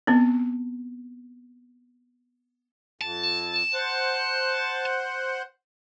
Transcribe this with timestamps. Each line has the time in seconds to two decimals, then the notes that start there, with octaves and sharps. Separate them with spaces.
0.07 B3 C4
3.01 F2 A5
3.74 C5 F#5